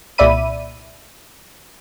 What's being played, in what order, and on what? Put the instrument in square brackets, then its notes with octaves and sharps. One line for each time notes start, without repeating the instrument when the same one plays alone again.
[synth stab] C2 A#2 D5 E5 B5 D#7